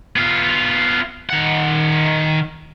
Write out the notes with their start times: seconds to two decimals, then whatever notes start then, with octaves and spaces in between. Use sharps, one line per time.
0.16 B3 F4
1.30 D#3 F#5